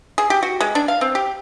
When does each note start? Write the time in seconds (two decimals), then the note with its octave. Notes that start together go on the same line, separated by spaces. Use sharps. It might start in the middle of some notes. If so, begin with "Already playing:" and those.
0.18 G#4
0.30 G4
0.43 F#4
0.61 G#3
0.75 D4
0.88 F5
1.01 C4
1.15 G4